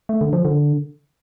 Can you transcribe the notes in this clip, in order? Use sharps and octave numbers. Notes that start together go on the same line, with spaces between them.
A3
D3
F3
D3